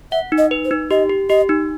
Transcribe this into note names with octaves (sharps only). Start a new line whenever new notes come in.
E5 F#5
D#4
D#5
B4
C5
D#4
G4 D#5
G4
G4 D#5
D#4